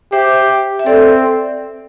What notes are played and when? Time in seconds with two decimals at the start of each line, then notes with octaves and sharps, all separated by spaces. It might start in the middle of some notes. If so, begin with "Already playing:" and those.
0.12 G4 C5 E5
0.79 E5
0.86 C4 A4 D5